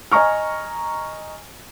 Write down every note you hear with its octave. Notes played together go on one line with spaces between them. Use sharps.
D#5 G#5 A#5 C#6 F6